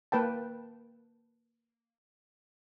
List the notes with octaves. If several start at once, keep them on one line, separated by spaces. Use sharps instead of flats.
A#3 B4 G5 A5